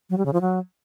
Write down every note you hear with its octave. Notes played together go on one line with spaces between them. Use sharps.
F#3
G3
C#3
F3
F#3